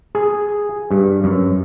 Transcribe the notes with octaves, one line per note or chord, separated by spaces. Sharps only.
G#4
G2
F#2